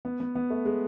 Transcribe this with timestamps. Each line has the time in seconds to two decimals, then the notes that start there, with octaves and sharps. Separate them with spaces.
0.05 B3
0.20 B3
0.35 B3
0.50 A3
0.65 G#3